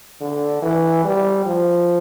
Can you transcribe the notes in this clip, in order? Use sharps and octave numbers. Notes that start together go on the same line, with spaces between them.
D3
E3
G3
F3